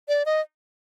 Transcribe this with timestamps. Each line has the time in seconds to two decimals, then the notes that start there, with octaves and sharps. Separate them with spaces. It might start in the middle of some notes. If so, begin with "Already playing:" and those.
0.08 D5
0.26 D#5